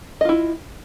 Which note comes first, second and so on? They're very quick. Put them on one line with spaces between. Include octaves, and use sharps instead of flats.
D#5 F4 E4